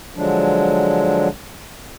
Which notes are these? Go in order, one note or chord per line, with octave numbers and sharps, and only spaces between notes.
D3 F3 F#3 G#3 D4